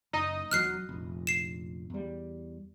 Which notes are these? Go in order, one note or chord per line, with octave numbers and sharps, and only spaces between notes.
F#1 D#4 D#5 D#6
E1 F3 F#3 F6 F#6 C7
F1 A#1
C7 E7
E2 G3